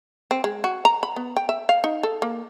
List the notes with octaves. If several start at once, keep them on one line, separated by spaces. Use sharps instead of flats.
C4
G#3
F#4
A#5
B5
B3
G5
E5
F5
D#4
A4
A#3